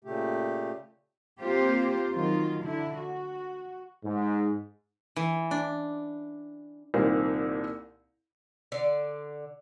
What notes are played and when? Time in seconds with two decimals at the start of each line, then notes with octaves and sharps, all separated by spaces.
0.04 A#2 C#3 A3 G4
1.39 A#3 C4 F4 G4 C5
2.13 D#3 F#3 F4
2.64 D3 E4
2.97 F#4
4.05 G#2
5.16 E3
5.51 D4
6.94 C2 A#2 D#3 A#3 C4
8.72 D3 D5